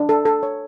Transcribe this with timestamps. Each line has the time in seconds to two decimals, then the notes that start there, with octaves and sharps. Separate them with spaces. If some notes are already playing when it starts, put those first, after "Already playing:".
Already playing: D4
0.09 A4
0.25 A4
0.43 C#5